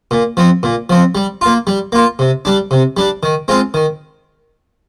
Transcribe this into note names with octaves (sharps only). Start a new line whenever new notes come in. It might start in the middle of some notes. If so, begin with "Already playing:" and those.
A#2
F3 C4
A#2
F3 C4
G3
A#3 F4
G3
A#3 F4
C3
G3 D4
C3
G3 D4
D#3
G#3 C4 F4
D#3